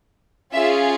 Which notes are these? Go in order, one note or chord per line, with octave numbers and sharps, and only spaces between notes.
C#4 F4 G#4 E5